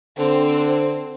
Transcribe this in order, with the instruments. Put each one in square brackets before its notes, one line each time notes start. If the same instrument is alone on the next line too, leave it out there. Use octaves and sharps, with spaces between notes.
[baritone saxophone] D3 [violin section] C4